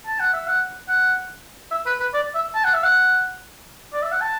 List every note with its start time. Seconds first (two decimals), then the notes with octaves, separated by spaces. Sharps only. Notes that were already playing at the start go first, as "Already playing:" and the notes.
0.06 A5
0.20 F#5
0.33 E5
0.47 F#5
0.88 F#5
1.71 E5
1.86 B4
2.00 B4
2.14 D5
2.35 E5
2.55 A5
2.65 F#5
2.74 E5
2.83 F#5
3.93 D5
4.02 E5
4.12 F#5
4.21 A5